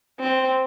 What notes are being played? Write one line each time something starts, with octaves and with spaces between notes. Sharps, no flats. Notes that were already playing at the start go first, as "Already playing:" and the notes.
C4